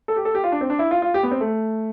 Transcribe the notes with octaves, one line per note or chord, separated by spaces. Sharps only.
A4
G4
A4
G4
F4
D4
C4
D4
E4
F4
F4
G4
B3
C4
A3